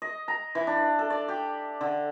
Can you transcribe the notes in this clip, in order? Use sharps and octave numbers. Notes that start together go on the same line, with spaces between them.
D#5
A#5
E3
D4
A4
D5
G4
D3